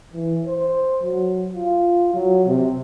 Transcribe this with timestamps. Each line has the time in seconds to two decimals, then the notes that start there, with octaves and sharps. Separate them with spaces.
0.14 E3
0.46 C5
1.03 F#3
1.53 F4
2.14 F#3
2.46 C3